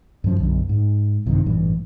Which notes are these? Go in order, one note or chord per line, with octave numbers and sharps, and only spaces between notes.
F#2 B2 F3 C#4
B1 F#2 D3
G#2
A#1 G2 C3 D#3
A1 G2 A#2 E3